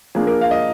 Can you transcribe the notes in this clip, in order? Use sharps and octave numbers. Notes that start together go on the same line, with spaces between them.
F3 A#3 D4 G#4
A#4
F5
D#5